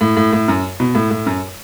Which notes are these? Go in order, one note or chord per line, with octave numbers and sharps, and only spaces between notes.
A2
A2
A2
F#2
B2
A2
A2
F#2